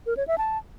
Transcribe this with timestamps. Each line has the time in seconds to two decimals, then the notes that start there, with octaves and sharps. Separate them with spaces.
0.06 A#4
0.17 C#5
0.27 E5
0.38 A5